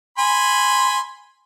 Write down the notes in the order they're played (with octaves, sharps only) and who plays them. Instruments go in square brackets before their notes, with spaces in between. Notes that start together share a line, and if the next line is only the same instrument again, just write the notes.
[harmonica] G#5 B5 C6